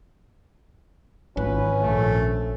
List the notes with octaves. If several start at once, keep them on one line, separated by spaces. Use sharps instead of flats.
G#1 E3 C#4 F4 B4
A#1 A3